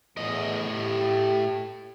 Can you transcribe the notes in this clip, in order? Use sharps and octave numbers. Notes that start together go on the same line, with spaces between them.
E2 A2 D#5
G4